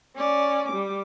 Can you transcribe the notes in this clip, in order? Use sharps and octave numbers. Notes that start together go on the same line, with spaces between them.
C#4 D5
G3 D6